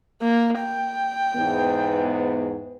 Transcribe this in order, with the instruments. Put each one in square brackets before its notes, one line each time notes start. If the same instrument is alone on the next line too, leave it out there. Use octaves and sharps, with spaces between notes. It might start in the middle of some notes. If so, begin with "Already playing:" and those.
[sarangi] A#3
G5
[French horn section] E2 G#2 B3